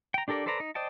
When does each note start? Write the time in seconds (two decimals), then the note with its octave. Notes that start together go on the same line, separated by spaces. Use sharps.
0.14 G5 A#5
0.28 D4 G4 A4 A#4 D5
0.46 A4 B4 C5 D5 A#5
0.60 D#4
0.75 C5 D5 D#5 G5 A5